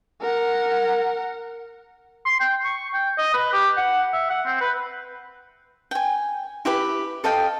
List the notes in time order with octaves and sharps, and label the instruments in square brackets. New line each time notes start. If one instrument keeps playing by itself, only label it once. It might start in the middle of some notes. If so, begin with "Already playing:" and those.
[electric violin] A#4 F#5
[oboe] C6
G5
C#6
G5
D#5
B4
G4
F#5
E5
F#5
C4
B4
[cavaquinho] G5 G#5
E4 G4 B4 B5
A4 D#5 F5 G5